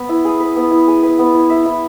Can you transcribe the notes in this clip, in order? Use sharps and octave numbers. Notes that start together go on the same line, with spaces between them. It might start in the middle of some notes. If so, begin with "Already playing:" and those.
Already playing: B3 B4
E4
G#4
B4
B3
E4
G#4
B4
B3
E4
E5
E4